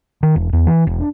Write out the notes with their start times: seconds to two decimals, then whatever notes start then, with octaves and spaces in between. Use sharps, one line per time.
0.23 D#3
0.36 E1
0.53 E2
0.67 E3
0.87 E1
1.00 D4